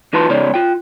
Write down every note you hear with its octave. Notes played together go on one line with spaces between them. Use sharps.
E3 D#4 F4 B4 A5 C6
C#2 C#3 B3 D#4 C#5 D5
F4 G5